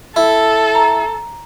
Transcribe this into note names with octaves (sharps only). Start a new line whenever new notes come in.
E4 A4
A#5